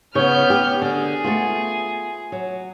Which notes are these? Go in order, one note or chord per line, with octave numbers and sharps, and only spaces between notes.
C#3 B3 C#5 F6 G6
G4
D3 G#4
A3 B3 F4
F#3